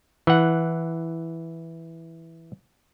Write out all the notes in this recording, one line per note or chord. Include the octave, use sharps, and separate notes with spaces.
E3 F#5